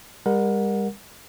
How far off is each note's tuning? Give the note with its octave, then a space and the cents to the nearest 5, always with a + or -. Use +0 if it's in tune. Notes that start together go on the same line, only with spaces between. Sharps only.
G3 +35 A#4 +10 F#5 -20